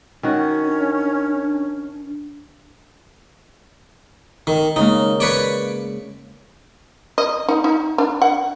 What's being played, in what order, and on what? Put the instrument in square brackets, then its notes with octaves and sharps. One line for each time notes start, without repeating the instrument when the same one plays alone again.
[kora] D#3 F#4 [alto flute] C#4
[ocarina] D4
[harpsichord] D#3
[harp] C#3 G#3 A#3 [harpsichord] D#4
[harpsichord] B4 C#5 D5
[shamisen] D#5
D#4
D#4
D4
F#5